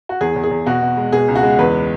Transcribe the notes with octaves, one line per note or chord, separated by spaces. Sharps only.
F#4
E2 G#4
E2
G#4
E2
B2 F#4
B2
G#3
B2 G#4
C#2
F#4
G#3
E2 B4